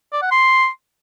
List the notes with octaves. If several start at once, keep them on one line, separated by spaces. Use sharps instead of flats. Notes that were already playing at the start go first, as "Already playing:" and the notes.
D5
F#5
C6